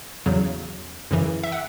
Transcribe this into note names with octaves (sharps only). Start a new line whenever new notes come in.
E2 C#3 F#3
F#2 C#3 E3
E5
F#5